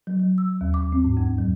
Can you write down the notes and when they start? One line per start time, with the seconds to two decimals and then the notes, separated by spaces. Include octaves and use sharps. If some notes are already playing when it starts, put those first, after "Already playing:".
0.07 F#3
0.19 F#3
0.38 E6
0.61 D#2
0.74 D6
0.92 C4
1.04 G#2
1.17 F2
1.38 F#3